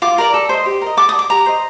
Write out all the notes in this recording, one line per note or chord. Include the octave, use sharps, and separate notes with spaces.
F4 D6
A#4 D5
A4
C5 D#5
G4
A#4 D#5
A4 D6
D#6
D5
D6
G4 A#5
C5 D#5